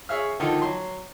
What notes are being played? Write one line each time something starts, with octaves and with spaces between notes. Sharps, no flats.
G#4 C#5 E5 F5 F6
D3 D#3 F3 D#4 F4 A4
F#3 C6